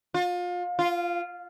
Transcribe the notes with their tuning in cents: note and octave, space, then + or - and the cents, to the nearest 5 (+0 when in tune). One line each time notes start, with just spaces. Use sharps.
F4 +30
F4 -10